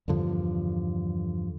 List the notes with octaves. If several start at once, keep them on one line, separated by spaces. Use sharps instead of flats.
E2 G2 D3 F3